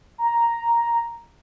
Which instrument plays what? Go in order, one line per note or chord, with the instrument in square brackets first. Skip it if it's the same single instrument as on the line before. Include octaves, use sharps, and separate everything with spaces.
[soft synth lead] A#5